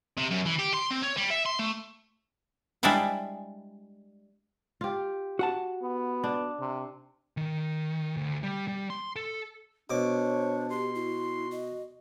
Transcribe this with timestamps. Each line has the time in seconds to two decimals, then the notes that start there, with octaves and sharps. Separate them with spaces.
0.17 C3
0.31 F#2
0.46 E3
0.59 G4
0.74 C6
0.90 C4
1.02 C#5
1.17 G3
1.30 E5
1.45 C6
1.59 A3
2.83 G3 G#3 D4 E4 C5 G#5
4.81 F4 G4
5.39 F#4 F#5 A5
5.82 B3
6.24 D4
6.60 C3
7.37 D#3
8.17 D2
8.43 G3
8.68 G3
8.90 C6
9.16 A4
9.90 B2 D4 C5 C#5 D6
10.70 G4 C6
10.95 E4 F#4
11.51 D#5